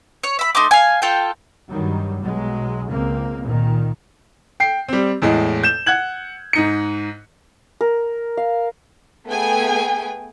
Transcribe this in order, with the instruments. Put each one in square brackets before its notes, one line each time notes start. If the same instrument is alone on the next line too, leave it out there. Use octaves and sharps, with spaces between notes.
[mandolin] C#5
E5 B5
A3 D#4 C6 D6
F5 G#5
F4 A4 G5
[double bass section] G2 D#3 F#3 G3
B1 B2 F#3 G#3
C#2 A#3 C4
A#2 D#3
[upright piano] G5 C7
G3 C4
E2 A2 G#3
G6 E7
F#5 F#6 G#6 F#7
G#2 D#4 C#7
[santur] A#4
F5
[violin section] A3 B3 G#4 G5 G#5